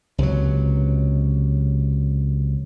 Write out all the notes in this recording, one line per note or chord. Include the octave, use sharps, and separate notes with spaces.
C#2 C3 E3 F#3